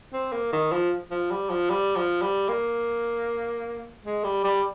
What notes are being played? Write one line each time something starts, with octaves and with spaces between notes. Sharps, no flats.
C4
A#3
D#3
F3
F3
G3
F3
G3
F3
G3
A#3
G#3
G3
G3